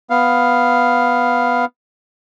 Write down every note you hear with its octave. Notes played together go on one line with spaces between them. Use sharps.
B3 F5